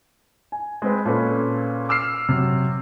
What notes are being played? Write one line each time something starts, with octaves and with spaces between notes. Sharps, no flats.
G#5
G#3 C4 B4
A#2 C#4 A4 B4
D6 E6 F6 C7
C3 F#3